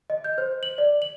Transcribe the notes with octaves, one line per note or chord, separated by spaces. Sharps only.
D#5
G6
C5
F#7
D5
F#7